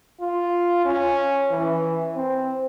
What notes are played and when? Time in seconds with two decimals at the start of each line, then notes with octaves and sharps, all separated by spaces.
0.21 F4
0.85 C#4
1.52 E3
2.16 C4